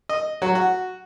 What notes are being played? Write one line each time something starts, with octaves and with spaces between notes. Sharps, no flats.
D#5
F#3
F#4